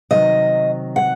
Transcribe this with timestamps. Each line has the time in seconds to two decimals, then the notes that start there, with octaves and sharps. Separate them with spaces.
0.11 C3 D#3 F#3 D#5
0.96 F#5